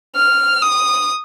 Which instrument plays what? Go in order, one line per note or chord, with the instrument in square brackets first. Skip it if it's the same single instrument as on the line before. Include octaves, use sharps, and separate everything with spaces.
[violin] F6
D#6